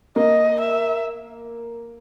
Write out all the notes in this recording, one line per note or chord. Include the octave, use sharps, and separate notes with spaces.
A#3 D#5
E5